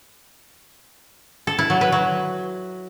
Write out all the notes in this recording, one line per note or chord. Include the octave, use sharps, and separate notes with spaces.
A4
E4
F#3
B4
F#3